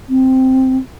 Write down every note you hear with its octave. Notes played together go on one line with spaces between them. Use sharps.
C4